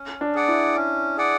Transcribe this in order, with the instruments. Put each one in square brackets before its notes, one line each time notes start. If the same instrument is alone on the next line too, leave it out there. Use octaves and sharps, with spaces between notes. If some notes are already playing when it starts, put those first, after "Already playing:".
Already playing: [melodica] C#4
[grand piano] D4
[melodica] G#4 D5 F#5
[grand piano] E4
[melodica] C#4
G#4 D5 F#5